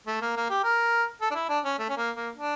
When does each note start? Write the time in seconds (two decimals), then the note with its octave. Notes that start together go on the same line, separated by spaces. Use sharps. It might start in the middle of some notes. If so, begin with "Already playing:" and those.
0.07 A3
0.22 A#3
0.37 A#3
0.50 G4
0.64 A#4
1.21 A4
1.31 D4
1.35 E4
1.49 D4
1.64 C#4
1.79 A3
1.89 C#4
1.97 A#3
2.16 A#3
2.36 D4